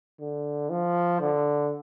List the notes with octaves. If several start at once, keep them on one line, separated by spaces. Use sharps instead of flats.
D3
F3
D3